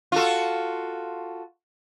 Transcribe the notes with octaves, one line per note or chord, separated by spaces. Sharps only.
F4 F#4 A4